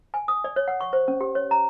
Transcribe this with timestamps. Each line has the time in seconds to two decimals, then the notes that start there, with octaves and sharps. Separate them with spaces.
0.14 G#5
0.28 D#6
0.44 D5
0.56 C#5
0.68 F#5
0.81 C#6
0.93 C5
1.08 C#4
1.21 G4
1.35 C#5
1.51 A#5